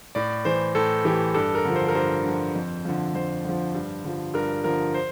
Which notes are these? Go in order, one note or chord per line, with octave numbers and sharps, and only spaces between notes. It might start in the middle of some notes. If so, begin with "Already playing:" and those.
A2 D5
E3 C5
A2 A4
E3 G4
G2 A4
A#4
D3 F3
C5
A#4
G2 C5
D3 F3
F2
D3 F3
F2 C5
D3 F3
G2
D3 F3
G2 A#4
D3 F3 A#4
C5